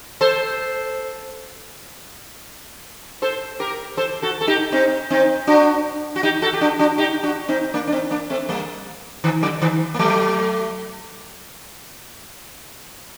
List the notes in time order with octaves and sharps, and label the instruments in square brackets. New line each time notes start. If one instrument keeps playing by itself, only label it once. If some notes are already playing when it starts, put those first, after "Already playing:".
[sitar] A4 C5
A4 C5
G4 A#4
A4 C5
F#4 A4
A4
D#4 G4
C4 D#4
C4 D#4
D4 F#4
F#4
D#4 G4
F#4 A4
G4
D4 F#4
D4 F#4
D#4 G4
D4 F#4
C4 D#4
A#3 D4
D4
C4 D#4
A#3 D4
A3 C4
G3 A#3
D#3
D3 F#3
D#3
A#3
F#3 A3